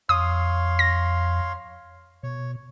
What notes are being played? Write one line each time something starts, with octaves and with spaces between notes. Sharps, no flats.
F2 C#5 F5 C6 D#6
A#6
B2 C#5